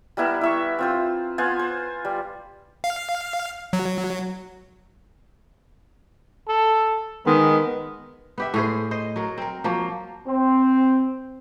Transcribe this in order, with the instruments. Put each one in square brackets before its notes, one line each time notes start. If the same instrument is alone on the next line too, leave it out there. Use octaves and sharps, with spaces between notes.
[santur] G3 B3 E4 A#4
E4 E5 C#6
C4 F4 C5
B3 F4 C5 G#5
C5
G3
[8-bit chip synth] F5
F#3
[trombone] A4
[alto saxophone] D#3 [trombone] G#3 [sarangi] B3
[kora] B3 G4 E5
A2 G#4 C5
C5 D#5
F#3 A#4
C4 A#4
F3 F#3 A#3
[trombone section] C4